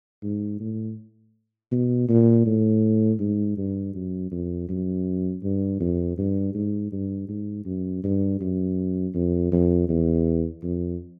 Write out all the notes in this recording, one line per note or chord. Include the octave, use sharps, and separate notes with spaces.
G#2
A2
B2
A#2
A2
G#2
G2
F#2
F2
F#2
G2
F2
G2
G#2
G2
G#2
F#2
G2
F#2
F2
F2
E2
F2